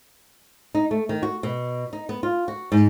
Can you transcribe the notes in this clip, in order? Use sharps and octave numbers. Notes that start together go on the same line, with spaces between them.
D#4
A3
D#3
F#4
B2
D#4
B3
F4
F#4
G#2